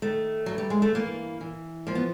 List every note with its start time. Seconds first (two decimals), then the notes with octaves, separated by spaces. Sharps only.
0.02 D#3 A3
0.46 G2 F#3
0.58 G3
0.70 G#3
0.82 A3
0.95 E3 A#3
1.41 E3
1.87 F3 A#3
1.95 B3